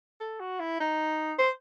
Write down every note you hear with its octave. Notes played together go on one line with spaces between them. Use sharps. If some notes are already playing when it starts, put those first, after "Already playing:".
A4
F#4
E4
D#4
C5